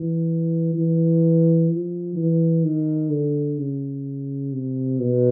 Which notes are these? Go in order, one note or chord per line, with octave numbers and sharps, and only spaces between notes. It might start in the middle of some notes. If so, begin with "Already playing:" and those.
Already playing: E3
E3
F3
E3
D#3
D3
C#3
C3
B2